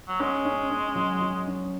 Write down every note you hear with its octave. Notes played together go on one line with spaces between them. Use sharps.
F#3
G#3 C#4
C#4
C#4
F#3
F#3
C#4